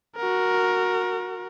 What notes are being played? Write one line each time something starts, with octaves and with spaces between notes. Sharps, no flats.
F#4 A#4